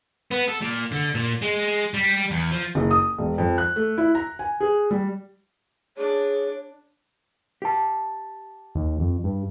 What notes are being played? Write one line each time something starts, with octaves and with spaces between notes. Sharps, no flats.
B3
A4
A#2
D3
A#2
G#3
G3
E2
F3
F#1
D#6
E1
F2
F#6
A3
E4
A#5
G#5
G#4
G3
D4 G#4 C#5
G4 A5
D#2
F2
G2